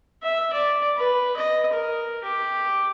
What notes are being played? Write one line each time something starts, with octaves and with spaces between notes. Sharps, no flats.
E5
D5
B4
D#5
A#4
G4